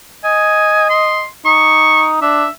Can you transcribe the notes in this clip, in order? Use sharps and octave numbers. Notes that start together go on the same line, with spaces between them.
D#5 G#5
C6
D#4 C#6
D4 E5